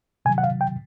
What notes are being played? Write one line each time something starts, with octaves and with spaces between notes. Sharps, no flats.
C3 D#3 F#3 G#5
F#5
F5
G5